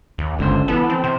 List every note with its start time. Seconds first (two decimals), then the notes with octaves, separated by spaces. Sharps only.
0.18 D#2
0.39 G1 C#2 D3 C5
0.68 E3 B3 A4
0.90 C4
1.04 C3 C5